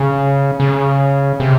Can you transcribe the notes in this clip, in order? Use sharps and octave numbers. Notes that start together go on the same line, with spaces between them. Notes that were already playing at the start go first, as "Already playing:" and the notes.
Already playing: C#3
C#3
C3